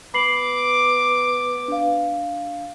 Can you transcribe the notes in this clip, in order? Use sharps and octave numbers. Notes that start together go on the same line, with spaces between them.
B3 B5 D6 C7 F#7
D4 F5